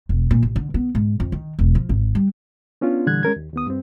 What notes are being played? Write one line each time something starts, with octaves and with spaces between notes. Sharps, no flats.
E1
A#2
A1
D3
B3
G#2
F2
D#3
E1
F3
G#1
G3
B3 C#4 D4 F4
A#2 D3 E3 G3 F#6 G#6
G#3 C#4 A#4 G#6
D#2
D#2 B3 D#6
G2 C4